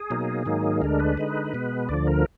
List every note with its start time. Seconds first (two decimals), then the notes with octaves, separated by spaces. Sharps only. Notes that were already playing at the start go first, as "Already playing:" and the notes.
Already playing: G#4
0.10 B2 F#3 A#3 D#4
0.46 G#2 D#3 F#3 A#3 D#4
0.82 D2 D3 G#3 D4 A#4
1.00 B4
1.17 D3 G#3 D#4
1.53 B2 G#3 B3
1.89 D2 D3 F3 D5
2.07 A#4